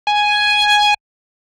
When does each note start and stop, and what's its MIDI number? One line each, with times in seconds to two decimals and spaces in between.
0.07 0.94 80